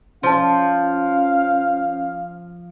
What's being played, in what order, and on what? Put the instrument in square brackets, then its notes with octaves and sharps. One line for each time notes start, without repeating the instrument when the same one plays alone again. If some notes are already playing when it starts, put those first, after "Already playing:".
[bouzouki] F3 [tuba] C#4 [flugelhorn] F5 [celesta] A5 C6